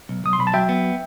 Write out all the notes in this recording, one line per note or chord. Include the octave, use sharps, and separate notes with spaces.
B1
B1 D#6
C6
B1 B5
A5
F#3 E5 G5
B3